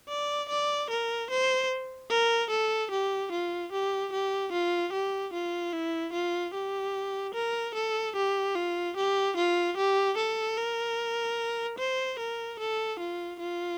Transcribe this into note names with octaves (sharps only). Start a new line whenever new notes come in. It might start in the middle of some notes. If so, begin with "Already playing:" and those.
D5
D5
A#4
C5
A#4
A4
G4
F4
G4
G4
F4
G4
F4
E4
F4
G4
A#4
A4
G4
F4
G4
F4
G4
A4
A#4
C5
A#4
A4
F4
F4